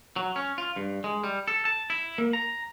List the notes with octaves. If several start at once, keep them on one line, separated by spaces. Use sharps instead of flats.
F#3
C#4
F4
G2
G#3
G3
A4
A5
E4
A#3
A#5